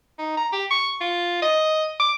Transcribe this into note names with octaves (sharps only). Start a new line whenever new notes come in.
D#4
A#5
G4
C#6
F4
D#5
D6